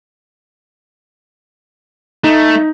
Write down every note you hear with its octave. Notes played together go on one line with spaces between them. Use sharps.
A3 D#4